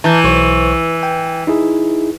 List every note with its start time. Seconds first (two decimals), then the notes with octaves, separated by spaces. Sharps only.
0.04 E3 A5 A#5 G6
0.24 B1 C5 C#6
1.03 G5
1.47 D#4 E4 G#4